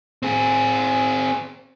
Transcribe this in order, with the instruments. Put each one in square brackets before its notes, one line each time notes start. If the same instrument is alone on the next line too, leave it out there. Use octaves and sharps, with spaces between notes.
[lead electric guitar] C4 G#4